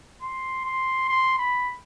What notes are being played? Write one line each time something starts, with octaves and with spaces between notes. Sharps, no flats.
C6
C6
C6
B5